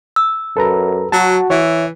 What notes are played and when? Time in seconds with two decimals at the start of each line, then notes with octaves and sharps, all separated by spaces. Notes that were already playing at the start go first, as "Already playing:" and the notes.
0.16 E6
0.57 F#2 A4 B4 A#5
1.12 F#3 F#4 A5
1.50 E3 C#5 E5